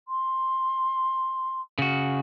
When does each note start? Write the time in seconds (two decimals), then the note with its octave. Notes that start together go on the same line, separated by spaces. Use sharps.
0.08 C6
1.79 C#3 F#4